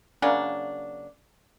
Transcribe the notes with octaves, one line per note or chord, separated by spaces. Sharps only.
C#3 F#3 A#3 D4